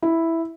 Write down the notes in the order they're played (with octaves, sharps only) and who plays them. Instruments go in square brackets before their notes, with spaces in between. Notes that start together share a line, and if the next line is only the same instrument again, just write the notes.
[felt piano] E4